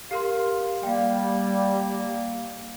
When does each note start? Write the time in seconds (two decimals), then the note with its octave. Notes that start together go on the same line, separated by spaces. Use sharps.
0.11 G4 A#4 F5 C6
0.83 G3 A#3 F5 G5